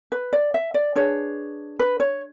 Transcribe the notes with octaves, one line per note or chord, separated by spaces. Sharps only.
B4
D5
E5
D5
D4 G#4 B4 C#5
B4
C#5